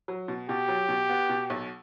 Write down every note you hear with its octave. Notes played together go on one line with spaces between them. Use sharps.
F#3
B2
B2 G4
F#3
B2
B3
B2
B1